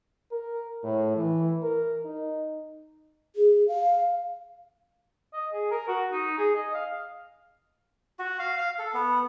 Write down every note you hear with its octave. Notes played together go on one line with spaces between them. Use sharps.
A#4
A2
E3
A#4
D#4
G#4
F5
D#5
G#4
A#4
F#4
D#4
G#4
D#5
F5
F#4
F5
F5
A4
B3